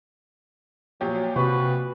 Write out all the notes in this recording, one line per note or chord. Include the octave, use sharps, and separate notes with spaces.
A#2 F3 F#3 G4 C#5
C3 F#4 B4